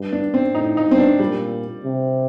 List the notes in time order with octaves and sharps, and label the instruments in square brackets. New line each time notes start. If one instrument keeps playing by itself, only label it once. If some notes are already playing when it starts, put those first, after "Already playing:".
Already playing: [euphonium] G2
[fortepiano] D4
C4
[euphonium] A2 [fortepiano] D#4
[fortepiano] D#4
[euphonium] G2 [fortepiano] C4
[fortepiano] D4
[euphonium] A#2 [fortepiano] G3
[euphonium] C3